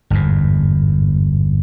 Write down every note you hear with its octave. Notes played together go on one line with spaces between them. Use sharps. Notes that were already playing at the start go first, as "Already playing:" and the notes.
G1 E2 G#2